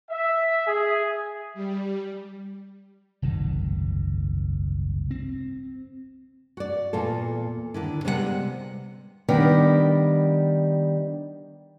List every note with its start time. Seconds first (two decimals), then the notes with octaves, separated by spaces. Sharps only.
0.11 E5
0.67 G#4
1.54 G3
3.22 F#1 C2 G#2 D#3
5.11 C4
6.57 F#4 D5
6.93 E2 A#2 F4 A4
7.74 D#2 D3 E4
8.05 C3 G3 G#3 B3 C5 F#5
9.28 D#3 G3 B3 D4